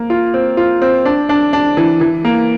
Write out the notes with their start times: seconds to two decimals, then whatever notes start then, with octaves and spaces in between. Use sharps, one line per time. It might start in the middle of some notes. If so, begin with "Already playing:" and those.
Already playing: A#3
0.10 F4
0.34 C4
0.57 F4
0.82 C4
1.05 D4
1.29 D4
1.53 D4
1.77 E3
2.01 E3
2.25 A#3